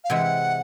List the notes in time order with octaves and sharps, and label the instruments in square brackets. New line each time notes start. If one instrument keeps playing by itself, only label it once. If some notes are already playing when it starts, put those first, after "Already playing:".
[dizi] F5
[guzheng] C3 E3 G#3 [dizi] F#5